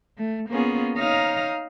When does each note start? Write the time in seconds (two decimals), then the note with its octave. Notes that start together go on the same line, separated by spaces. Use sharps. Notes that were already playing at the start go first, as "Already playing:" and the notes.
0.18 A3
0.50 A#3 B3 C#4 F4 G#4
0.97 D#4 C#5 F5 A#5 D#6 F6